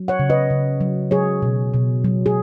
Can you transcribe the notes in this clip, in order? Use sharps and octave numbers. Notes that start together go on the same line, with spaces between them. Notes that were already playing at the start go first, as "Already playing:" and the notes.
Already playing: F#3
C#5 F#5
C#3
B4 D#5
C#3
F#3
F#3 G#4 C#5
B2
B2
F#3
G#4